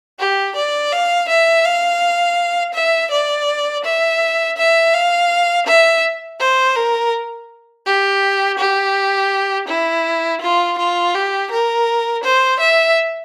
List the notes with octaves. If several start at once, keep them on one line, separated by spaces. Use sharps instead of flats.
G4
D5
F5
E5
F5
E5
D5
E5
E5
F5
E5
C5
A#4
G4
G4
E4
F4
F4
G4
A#4
C5
E5